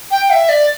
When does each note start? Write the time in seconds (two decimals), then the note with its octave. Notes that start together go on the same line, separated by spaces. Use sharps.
0.11 G5
0.30 E5
0.49 D5